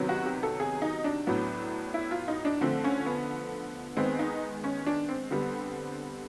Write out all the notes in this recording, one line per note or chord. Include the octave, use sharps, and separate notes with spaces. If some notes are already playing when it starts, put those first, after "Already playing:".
Already playing: C3 D#3 F#3 B3
F#4
G4
A4
G#4
D#4
D4
A2 F#3 B3
E4
F4
D#4
D4
D3 F3 A3 C4
C#4
B3
D#3 G#3 B3 C4
D#4
C#4
D4
C4
D3 G3 B3